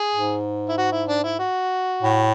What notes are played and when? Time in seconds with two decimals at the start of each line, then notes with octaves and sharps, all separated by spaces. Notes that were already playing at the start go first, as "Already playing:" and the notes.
Already playing: G#4
0.14 G#2
0.69 E4
0.77 F#4
0.92 E4
1.08 D4
1.23 E4
1.39 F#4
2.02 A2